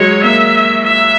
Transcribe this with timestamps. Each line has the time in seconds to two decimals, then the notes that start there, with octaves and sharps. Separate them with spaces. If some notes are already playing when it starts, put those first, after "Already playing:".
Already playing: F#3 G#3 C#5
0.23 A#3 E5
0.84 E5